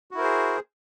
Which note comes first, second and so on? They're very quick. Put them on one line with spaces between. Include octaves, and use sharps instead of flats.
F#4 E4 A#4 C5 G#4